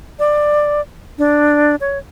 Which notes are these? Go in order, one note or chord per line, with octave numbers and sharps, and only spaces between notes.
D5
D4
C#5